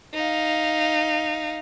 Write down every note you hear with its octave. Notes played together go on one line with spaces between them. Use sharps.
D#4 F5